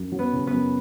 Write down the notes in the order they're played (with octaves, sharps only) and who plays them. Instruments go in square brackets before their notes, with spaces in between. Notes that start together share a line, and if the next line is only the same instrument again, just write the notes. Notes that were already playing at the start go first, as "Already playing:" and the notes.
Already playing: [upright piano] F#2
F#3
[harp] B3 B4
[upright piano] C#3
[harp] B3 B4
[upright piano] F#2